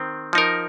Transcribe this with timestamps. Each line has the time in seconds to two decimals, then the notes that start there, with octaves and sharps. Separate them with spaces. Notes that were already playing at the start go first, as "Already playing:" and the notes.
Already playing: D#3 C4
0.33 F3 D#4 A#4